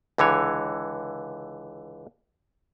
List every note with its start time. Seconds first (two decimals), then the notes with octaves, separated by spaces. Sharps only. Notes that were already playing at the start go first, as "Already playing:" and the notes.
0.18 C#2 D3 E3 C#5